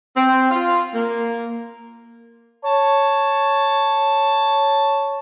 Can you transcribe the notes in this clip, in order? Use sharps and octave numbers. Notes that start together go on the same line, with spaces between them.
C4
F4
A#3
C#5 A5